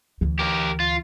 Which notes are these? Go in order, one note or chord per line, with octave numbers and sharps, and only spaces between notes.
D2 E3
G4 A#4
F4